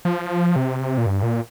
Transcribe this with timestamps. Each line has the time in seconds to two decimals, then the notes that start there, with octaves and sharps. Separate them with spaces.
0.05 F3
0.56 C3
0.98 A#2
1.06 G2
1.23 A#2